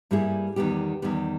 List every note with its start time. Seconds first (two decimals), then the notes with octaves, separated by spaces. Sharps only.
0.11 G2 G3 A#3 E4 G#4
0.56 E2 D#3 G3 B3 G4
1.02 E2 D#3 G3 B3 G4